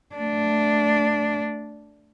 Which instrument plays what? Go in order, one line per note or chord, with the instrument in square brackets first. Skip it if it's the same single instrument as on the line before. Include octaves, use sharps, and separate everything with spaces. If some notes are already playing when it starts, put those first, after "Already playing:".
[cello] A3 D4